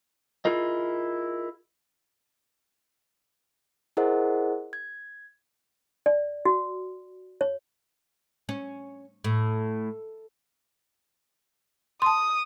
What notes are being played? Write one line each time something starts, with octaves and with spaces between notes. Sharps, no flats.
E4 F4 G#4 A#4 D#5
E4 G#4 A#4 C5 D#5 F#5
G#6
D5
F#4
C#5
C#4
A2
A5 C6 D#6